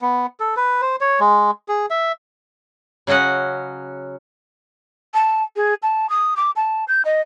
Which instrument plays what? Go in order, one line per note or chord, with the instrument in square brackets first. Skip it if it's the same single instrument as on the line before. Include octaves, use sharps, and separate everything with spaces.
[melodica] B3
A4
B4
C5
C#5
G#3
G#4
E5
[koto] C#3 F#3 C#4 D#5 F#5
[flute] A5
G#4
A5
D#6
D6
A5
G6
D#5